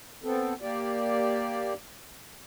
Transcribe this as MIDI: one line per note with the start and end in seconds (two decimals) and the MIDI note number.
0.24 0.54 59
0.24 0.54 60
0.24 0.54 69
0.62 1.74 58
0.62 1.74 67
0.62 1.74 74